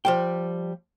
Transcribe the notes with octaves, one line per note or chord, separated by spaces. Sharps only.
F3 G3 G5